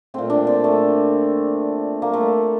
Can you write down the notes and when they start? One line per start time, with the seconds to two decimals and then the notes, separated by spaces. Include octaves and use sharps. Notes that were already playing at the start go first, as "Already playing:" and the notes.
0.14 A#2 A3 C4
0.30 D4
0.47 C4
0.64 A3
2.02 A#3
2.13 A3